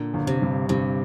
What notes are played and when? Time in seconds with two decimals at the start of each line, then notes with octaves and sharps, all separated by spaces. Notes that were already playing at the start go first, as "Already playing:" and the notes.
Already playing: A#2 D3
0.14 G1
0.27 C3
0.42 G2
0.69 G2 C3